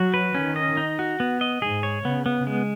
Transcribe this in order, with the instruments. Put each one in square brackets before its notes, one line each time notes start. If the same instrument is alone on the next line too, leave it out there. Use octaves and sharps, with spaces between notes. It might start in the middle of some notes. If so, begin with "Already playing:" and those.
Already playing: [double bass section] F#3 [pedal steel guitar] F#4
[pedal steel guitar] B4
[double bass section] D#3 [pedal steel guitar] C#4
[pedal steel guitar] D#5
D#4
F#4
B3
D#5
[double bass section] G#2 [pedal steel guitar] G#4
[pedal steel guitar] C#5
[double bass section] C#3 [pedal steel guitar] B3
[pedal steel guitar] B3
G#3